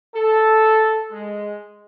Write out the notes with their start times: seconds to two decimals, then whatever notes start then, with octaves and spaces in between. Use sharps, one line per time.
0.14 A4
1.12 G#3